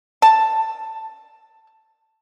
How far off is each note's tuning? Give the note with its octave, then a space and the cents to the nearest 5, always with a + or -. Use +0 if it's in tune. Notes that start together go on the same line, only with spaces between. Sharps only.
A5 +5